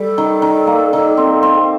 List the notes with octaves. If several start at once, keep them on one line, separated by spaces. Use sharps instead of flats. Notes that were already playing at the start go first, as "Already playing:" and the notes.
Already playing: G3 A4
D#3
D#3
A#3
D#3
C4
C4